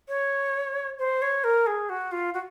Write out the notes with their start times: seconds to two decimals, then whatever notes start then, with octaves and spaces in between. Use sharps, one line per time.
0.08 C#5
0.99 C5
1.22 C#5
1.44 A#4
1.67 G#4
1.89 F#4
2.12 F4
2.34 F#4